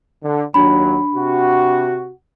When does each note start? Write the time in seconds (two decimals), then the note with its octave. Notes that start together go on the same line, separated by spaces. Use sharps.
0.22 D3
0.54 D#2 F#3 D4 B5
1.14 C3 F#4